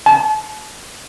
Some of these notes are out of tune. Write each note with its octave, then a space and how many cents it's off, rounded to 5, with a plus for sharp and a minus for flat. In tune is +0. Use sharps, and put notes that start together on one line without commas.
A5 -40